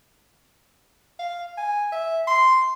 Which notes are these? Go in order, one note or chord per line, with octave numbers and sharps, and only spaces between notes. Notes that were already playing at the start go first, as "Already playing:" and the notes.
F5
G#5
E5
C6